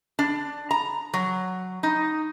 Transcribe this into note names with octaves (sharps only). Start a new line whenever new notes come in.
D4
A#5
F#3
D#4